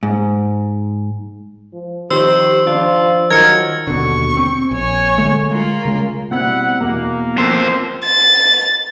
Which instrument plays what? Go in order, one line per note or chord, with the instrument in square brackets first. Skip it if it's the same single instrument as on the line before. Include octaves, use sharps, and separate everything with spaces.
[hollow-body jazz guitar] G#2
[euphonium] F3
[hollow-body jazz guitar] D#3 F3 [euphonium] G4 [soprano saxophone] C5 [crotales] E6
[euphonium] F3 [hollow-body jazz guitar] D4 [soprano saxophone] F4
[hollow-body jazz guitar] D#3 F#3 [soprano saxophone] A#4 [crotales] G#6 C#7
[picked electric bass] D#2 B2 D3 [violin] C#6
[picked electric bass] C4
[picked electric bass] A#1 [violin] C#5 G#5
[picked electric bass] D3 G#3 A3
[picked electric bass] G#3 [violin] A#3 F4
[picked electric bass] C#3 G#3
[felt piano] B2 C4 F#6 [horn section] G3 E4 F#5
[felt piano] E2 B2 A#5 [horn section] A#3
[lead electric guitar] F2 C5 [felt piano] A#4 C6 E6
[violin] A6